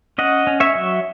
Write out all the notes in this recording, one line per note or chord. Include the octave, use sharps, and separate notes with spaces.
C#4 D#5 F#5
C#4
C#5 E5
F#3